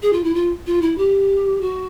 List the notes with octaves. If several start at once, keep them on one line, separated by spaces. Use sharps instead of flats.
G#4
F4
E4
F4
F4
E4
G4
F#4